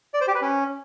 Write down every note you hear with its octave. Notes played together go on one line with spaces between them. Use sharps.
D5
C5
G4
B4
C#4